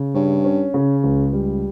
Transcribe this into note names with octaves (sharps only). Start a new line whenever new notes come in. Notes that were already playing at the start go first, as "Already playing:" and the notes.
Already playing: C#3
G2 C#4
C#4
C#3
C#2
G3